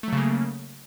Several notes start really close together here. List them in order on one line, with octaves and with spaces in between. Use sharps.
A3 F#3 C#3 A#3